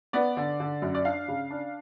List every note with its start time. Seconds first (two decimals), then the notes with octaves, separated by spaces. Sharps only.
0.13 B3 D5
0.37 D3
0.60 D3
0.82 F#2
0.95 D5
1.05 D4 F5
1.28 C#3
1.50 D4